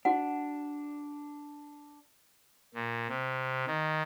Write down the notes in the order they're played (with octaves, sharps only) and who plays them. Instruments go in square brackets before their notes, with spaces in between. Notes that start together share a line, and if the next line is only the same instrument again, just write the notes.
[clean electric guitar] D4 [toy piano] F#4 F#5
[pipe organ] A#2
C3
D#3